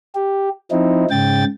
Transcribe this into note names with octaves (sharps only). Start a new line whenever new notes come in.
G4
F3 C4 D#4 E4
G#2 C#3 G5 A6